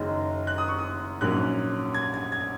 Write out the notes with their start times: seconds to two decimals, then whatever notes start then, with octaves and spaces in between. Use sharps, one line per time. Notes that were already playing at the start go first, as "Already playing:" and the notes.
Already playing: F#1 F#2 D#3 G#3 D#4
0.47 F#6
0.58 D#6
0.68 C#6
0.79 D#6
1.21 A#1 G#2 F#3 A#3 C#4 F#6
1.94 G#6
2.14 G#6
2.32 G#6